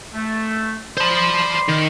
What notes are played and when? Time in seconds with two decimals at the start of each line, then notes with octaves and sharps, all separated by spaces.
0.14 A3
0.98 C5 D5 A5 B5 C6
1.69 D#3